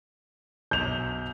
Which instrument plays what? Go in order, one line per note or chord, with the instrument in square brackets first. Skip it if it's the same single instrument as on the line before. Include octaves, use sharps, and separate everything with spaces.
[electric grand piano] B1 [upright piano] G6 F7